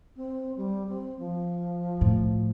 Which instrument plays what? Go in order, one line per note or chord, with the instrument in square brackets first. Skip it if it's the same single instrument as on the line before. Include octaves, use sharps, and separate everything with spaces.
[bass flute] C4
G3
C4
F3
[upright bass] A2